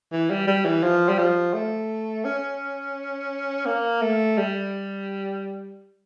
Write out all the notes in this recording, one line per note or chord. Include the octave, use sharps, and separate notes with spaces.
E3
G3
G3
E3
F3
G3
F3
A3
C#4
A#3
A3
G3